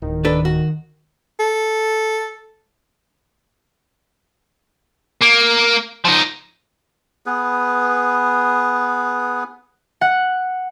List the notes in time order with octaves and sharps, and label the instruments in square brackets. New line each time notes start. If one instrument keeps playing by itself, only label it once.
[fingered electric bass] D1 [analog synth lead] D#3
[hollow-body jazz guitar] D4 A4 B4
F#4
[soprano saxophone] A4
[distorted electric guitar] A#3
F3 D#4
[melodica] B3 G#4 B4
[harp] F#5